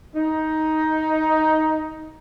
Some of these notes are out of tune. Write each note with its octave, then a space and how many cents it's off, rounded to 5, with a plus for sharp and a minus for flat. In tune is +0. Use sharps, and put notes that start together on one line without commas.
D#4 +10